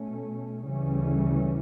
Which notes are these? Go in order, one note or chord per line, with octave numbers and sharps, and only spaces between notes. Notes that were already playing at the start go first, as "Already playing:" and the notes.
Already playing: B2 A3 C#4
D2 C#3 E3 G3 C#4